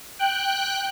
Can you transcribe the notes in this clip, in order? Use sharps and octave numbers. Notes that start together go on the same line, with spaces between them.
G5 F#6